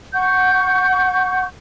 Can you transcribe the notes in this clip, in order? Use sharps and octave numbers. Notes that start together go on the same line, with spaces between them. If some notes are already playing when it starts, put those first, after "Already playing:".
F#5 C#6 G6